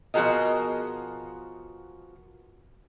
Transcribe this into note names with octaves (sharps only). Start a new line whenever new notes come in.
B2 F3 F#4 G#4 A#4 D#5